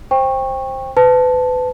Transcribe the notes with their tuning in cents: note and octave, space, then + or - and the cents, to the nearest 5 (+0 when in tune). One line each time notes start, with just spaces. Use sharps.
C5 +15 G5 +20 C#6 -15
B4 +30 A5 +0